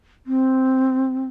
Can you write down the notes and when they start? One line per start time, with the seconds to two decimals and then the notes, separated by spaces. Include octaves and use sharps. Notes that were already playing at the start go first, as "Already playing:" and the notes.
0.27 C4